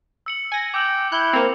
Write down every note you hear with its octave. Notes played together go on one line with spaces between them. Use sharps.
E6 C#7 F#7
G#5 A#6
G5 D6 E6 F#7
E4 F#6 G6
A#3 C4 F7